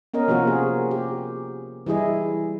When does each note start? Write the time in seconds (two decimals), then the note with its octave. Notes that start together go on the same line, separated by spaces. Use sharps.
0.14 B3 C#4 A#4 D#5
0.28 C3 F3 A#3 F4 F#4 A#4
0.47 G#4
0.91 G4
1.86 E3 G3 E4 G#4 D#5